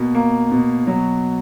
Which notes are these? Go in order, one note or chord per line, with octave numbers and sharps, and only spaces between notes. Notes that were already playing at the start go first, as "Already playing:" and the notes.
Already playing: B2 A#3
A#3
B2
F#3